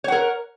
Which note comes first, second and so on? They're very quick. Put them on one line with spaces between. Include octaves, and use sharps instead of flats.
C#5 F#5 A#4